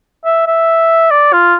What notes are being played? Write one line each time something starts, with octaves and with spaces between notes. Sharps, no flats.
E5
E5
D5
F4